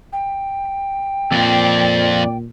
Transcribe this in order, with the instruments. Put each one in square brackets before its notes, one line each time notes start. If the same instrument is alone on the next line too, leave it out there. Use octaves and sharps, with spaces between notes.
[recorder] G5
[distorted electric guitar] F2 C4 [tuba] A#2 [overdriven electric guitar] D5